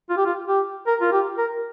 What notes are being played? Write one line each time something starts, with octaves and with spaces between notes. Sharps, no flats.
F4
G4
F4
G4
A#4
F4
G4
A#4